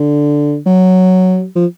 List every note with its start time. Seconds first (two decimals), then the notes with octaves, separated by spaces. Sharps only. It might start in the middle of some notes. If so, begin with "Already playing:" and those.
Already playing: D3
0.66 F#3
1.56 F3